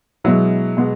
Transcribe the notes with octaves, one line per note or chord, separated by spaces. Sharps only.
B2 F#3 G#3 B3 E4
B2 G#3 B3